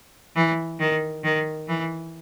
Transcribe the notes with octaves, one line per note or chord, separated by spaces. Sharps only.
E3
D#3
D#3
E3